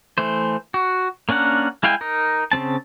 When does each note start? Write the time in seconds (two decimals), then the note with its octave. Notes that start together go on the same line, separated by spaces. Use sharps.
0.18 E3 A3 C5
0.74 F#4
1.29 A#3 C#4 D4 A#4 F#5
1.83 G#3 E4 F5 G5 G#5
2.01 D#4 A#4
2.52 C#3 G3 C4 A5